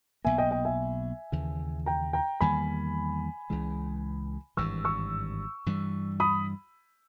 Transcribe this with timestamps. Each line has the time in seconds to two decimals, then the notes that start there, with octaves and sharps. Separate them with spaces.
0.24 B1 B2 A#3 E5 G#5
0.38 D#5 G5
0.51 D#5 G5
0.65 E5 G#5
1.32 D#2 C#3 E3
1.86 G5 A#5
2.13 G5 A#5
2.41 E2 D#3 G3 A#3 G#5 B5
3.50 C#2 C#3 E3 G#3
4.57 G#1 G2 E3 C#6 E6
4.85 C#6 E6
5.66 G2 E3 G3
6.20 B5 D#6